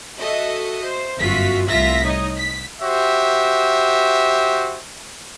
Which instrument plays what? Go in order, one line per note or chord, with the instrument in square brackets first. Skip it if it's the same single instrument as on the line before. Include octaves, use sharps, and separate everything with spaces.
[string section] F#4 A4 D#5 E5
C5
G1 F#2 F4 F#4 E5 B6
C2 A2 F4 E5 A#6 B6
D#4 C#5 D#5
B6
[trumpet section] F#4 G4 C5 E5